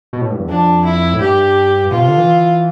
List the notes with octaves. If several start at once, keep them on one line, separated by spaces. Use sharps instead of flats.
B2
A2
G2
E2
F2 D4
E4
A2
G2 G4
B2 F4
C3
D3
E3